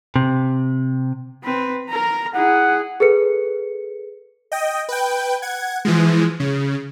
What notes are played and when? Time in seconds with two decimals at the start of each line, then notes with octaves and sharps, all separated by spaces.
0.16 C3
1.44 C4 B4
1.89 A#4 A#5
2.34 E4 G#4 F#5
3.00 G#4 A4 B4 C#7
4.52 D#5 G5
4.89 B4 G5
5.42 F#5 G#6
5.85 E3 F3 G#3
6.40 C#3